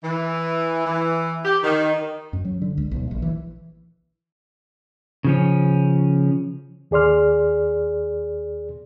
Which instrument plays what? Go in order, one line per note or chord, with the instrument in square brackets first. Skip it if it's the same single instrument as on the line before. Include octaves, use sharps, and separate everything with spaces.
[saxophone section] E3
E3
G4
D#3
[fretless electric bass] F#2
F#3
D3
C#2
B1
A#1
E3
[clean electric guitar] C#3 F3 C#4
[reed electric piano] D#2 G#4 D5 C6 F6